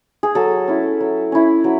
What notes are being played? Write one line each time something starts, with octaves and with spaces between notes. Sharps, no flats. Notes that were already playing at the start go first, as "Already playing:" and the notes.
G#4
F#3 A4
C#4 E4
F#3
C#4 E4
F#3